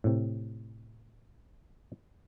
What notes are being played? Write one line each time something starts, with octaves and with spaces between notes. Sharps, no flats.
A2 C3